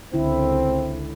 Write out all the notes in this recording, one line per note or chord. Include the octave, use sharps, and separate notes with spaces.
C#2 D3 C4 E4